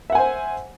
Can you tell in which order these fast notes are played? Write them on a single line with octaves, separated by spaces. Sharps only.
E5 F#5 G#5 C5